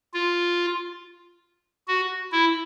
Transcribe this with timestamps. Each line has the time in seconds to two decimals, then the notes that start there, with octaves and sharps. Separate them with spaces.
0.14 F4
1.88 F#4
2.32 E4